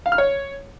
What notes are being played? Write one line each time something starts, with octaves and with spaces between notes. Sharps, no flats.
F5
F6
C#5